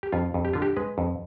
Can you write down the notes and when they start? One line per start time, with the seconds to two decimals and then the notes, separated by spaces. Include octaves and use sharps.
0.03 G4
0.12 F2 F4
0.34 F2
0.45 G4
0.53 D3 F4
0.62 G4
0.76 G#3 B4
0.98 F2